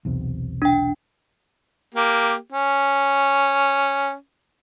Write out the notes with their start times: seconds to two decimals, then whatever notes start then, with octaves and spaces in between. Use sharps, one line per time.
0.05 B1 E2 C3
0.62 D4 G5
1.94 A#3 G4
2.52 C#4